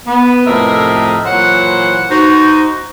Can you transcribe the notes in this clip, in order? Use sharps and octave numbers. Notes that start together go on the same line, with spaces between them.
B3
F2 A2 C3 A#4 D#5 E5
A#2 E3 F#3 C5 F#5
D#4 F#4 C5